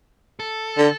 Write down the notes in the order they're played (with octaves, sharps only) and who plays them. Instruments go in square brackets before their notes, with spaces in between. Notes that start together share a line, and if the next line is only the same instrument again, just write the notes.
[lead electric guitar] A4
[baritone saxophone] D3